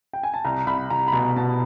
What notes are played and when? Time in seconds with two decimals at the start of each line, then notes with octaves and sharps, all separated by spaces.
0.13 G5
0.23 G#5
0.34 A5
0.45 C2 A#5
0.67 C2 B5
0.90 C2 A#5
1.08 B5
1.13 B2 A#5
1.36 B2 A5